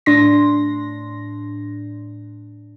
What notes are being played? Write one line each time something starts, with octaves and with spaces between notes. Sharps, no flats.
A2 D4 C6 A#6